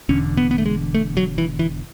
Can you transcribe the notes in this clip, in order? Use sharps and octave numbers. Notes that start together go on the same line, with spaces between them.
E1 E2 D3 C#4
B3
B3
A3
G#3
A3
F#3
E3
E3